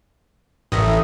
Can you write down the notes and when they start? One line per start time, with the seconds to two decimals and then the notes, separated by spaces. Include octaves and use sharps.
0.72 A1 A3 A#4 D#6